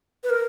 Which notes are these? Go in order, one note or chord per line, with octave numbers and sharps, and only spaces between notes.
B4
A#4